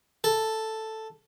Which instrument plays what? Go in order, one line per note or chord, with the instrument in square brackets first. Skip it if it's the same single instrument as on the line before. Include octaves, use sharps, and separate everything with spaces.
[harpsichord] A4